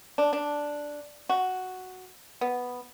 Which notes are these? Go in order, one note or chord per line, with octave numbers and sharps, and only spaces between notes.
D4
D4
F#4
B3